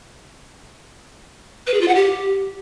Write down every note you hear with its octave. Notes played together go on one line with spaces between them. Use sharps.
B4
G#4
F4
F#5
G4